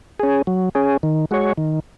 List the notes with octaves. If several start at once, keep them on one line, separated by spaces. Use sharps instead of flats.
C#4 G#4
F#3
C#4 G#4
D#3
G#3 F#4 C#5
D#3